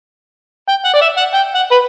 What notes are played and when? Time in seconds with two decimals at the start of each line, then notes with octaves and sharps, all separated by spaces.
0.69 G5
0.85 F#5
0.94 D5
1.01 E5
1.17 F#5
1.34 G5
1.55 F#5
1.71 B4